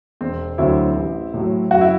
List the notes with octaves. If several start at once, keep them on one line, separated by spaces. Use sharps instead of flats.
E1 C4
D2 D3 F#3 C4 E4
A1
A2 F#3
F#1 F#4
E4